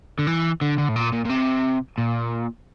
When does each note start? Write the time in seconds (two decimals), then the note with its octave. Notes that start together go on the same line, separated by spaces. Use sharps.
0.19 D3
0.27 E3
0.61 D3
0.78 D3
0.89 A2
0.96 A#2
1.12 A#2
1.25 A#2
1.29 C3
1.98 A#2